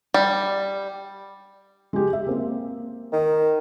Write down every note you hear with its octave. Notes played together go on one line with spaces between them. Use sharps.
G3
G#3 G4
E5
A#3 C4
D#3